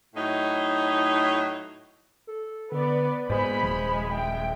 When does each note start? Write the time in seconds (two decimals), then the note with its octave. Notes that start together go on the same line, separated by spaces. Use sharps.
0.16 A2 F#3 D#4
2.27 A4
2.72 D3 B3 B4 D5
3.30 G#2 G#3 A#3 B3 C5 B5
3.63 D#1 F3
4.13 E5 G5